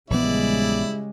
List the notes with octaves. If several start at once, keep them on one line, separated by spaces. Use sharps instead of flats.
A#1 C#3 E3 G3 G#3 B3 E4 D5